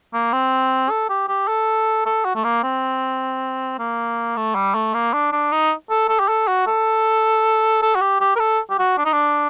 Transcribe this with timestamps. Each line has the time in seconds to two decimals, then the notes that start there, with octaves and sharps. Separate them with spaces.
0.14 A#3
0.33 C4
0.90 A4
1.10 G4
1.29 G4
1.48 A4
2.06 A4
2.25 F#4
2.35 A3
2.44 A#3
2.63 C4
3.79 A#3
4.37 A3
4.56 G3
4.75 A3
4.94 A#3
5.14 D4
5.32 D4
5.52 D#4
5.90 A4
6.09 A4
6.20 G4
6.28 A4
6.48 F#4
6.67 A4
7.82 A4
7.96 F#4
8.01 G4
8.21 G4
8.36 A#4
8.40 A4
8.70 G4
8.79 F#4
8.98 D4
9.05 D#4
9.13 D4